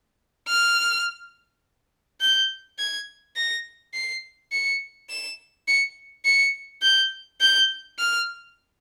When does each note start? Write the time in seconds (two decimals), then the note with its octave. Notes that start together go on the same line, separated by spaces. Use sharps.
0.48 F6
2.21 G6
2.79 G#6
3.36 A#6
3.94 C7
4.52 C#7
5.09 E7
5.68 C#7
6.25 C#7
6.82 G6
7.41 G6
7.98 F6